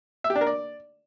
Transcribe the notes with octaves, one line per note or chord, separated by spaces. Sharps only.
E5
G4
D4
A#4
D5